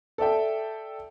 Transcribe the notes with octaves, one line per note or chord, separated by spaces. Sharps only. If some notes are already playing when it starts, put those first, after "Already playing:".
A4 D5 E5 G5